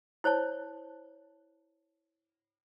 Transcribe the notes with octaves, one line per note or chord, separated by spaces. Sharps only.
E4 C5 C#5 A5